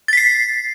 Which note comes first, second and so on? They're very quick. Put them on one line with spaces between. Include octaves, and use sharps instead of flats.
A6 B6 C7